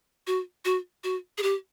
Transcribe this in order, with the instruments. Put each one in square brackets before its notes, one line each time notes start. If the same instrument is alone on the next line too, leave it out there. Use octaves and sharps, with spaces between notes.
[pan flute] F#4
F#4
F#4
G#4
G4